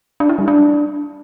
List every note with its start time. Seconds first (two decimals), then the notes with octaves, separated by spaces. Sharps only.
0.20 D4
0.29 E4
0.39 G3
0.48 D4